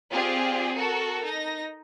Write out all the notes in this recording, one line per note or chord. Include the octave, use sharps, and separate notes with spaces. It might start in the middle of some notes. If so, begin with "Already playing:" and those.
C4 F4 G4 G#4 D5
F#4 A4 A#4 C#6
D#4 A#6